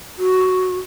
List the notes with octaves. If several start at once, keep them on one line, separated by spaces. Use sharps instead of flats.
F#4